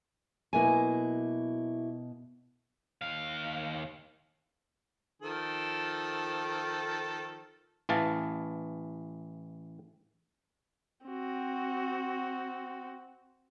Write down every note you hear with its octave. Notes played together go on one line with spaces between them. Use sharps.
B2 F#3 A#3 E4 G#5
D#2 F5
D#3 F3 A4
A1 E3 F5 A5
C4 F#4